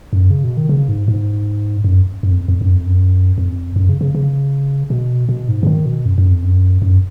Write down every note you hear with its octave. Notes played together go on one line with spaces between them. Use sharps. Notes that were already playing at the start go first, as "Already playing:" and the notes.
F#2
C#3
B2
D#3
C#3
G#2
G#2
F#2
F#2
F2
F2
F#2
F2
F#2
F2
F#2
C#3
C#3
C#3
B2
B2
G#2
C#3
D#3
B2
F#2
F#2
F2
F#2
F#2